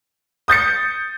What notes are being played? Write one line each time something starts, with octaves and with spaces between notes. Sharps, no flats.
D#6 G6 A6 C#7